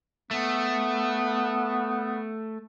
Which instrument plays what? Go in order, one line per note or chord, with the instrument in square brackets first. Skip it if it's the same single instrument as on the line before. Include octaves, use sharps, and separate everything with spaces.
[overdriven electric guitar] A3 [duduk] B3